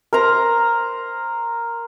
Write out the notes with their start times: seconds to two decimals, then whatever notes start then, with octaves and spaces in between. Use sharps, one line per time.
0.13 A#4 C5 A#5